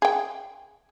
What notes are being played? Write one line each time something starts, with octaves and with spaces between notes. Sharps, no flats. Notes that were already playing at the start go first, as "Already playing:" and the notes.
G#4 G5